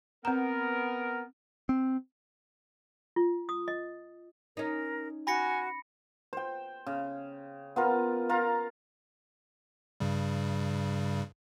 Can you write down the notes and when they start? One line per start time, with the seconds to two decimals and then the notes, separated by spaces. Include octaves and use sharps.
0.25 B3 C4 A#4 A#5
1.69 C4
3.16 F4
3.49 D#6
3.68 D#5
4.57 C#4 D#4 A#4
5.27 F#4 G#5 B5 A#6 C#7
6.33 C5 G5
6.86 C#3
7.76 B3 F4 A#4
8.29 F4 A#4 A#5
10.00 G2 C#3 G3